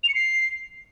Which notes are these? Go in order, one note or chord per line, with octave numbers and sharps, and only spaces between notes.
F7
C#7
C7